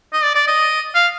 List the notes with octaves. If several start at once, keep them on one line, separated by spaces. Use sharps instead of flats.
D#5
D5
D5
D#5
F5